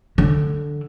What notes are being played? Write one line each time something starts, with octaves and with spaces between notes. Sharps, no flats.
D3